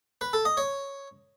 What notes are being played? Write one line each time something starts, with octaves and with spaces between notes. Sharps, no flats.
B4
A4
D#5
C#5